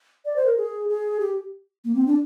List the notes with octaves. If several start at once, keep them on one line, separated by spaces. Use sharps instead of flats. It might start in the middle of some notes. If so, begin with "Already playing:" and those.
D5
C5
A#4
G#4
G#4
G4
A#3
C4
D4